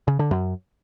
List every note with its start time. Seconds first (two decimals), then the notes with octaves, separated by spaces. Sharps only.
0.08 C#3
0.19 D3
0.31 F#2